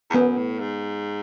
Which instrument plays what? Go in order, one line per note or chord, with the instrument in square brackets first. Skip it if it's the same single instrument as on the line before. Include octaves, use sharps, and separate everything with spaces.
[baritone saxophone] E2
[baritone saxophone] F#2 [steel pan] B3
[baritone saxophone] A2
G#2